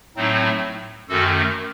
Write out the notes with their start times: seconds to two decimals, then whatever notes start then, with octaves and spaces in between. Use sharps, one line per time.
0.16 A2 F#3 A3 C4 D#4
1.09 F#2 D#3 A3 F#4 A4